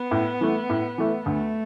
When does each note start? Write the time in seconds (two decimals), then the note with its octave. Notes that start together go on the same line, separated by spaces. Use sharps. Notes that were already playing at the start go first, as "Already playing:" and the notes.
Already playing: B3
0.11 A2
0.41 E3 A3
0.69 A2
0.98 E3 A3
1.26 D2 A3